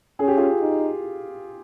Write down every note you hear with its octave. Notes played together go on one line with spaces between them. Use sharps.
C#4 G#4
G4
F4 G#4
D#4